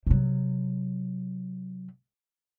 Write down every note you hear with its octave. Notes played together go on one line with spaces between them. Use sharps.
C3 F#3